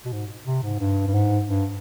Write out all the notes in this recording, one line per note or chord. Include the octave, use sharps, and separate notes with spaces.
B2
G#2
C3
G#2
G2
G2
G#2
G2